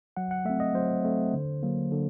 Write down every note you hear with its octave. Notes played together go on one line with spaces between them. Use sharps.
F#3 F#5
F#5
A3 C4 E5
D#5
F#3 C5
A3 C4
D3
F#3 A#3
D3